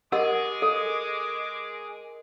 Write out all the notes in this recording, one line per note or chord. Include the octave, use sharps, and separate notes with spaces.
G#3 G4 G#4 A#4 D#5 F#5 D6 E6
A4